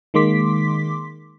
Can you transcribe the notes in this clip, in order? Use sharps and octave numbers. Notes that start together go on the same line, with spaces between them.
D#3 G#3 A#3 C6 D6 B6